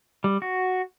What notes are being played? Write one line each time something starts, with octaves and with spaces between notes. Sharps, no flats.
G3
F#4